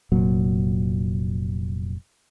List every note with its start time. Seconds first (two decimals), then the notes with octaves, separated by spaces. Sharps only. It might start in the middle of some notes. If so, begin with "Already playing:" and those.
0.12 F1 A#2 F#3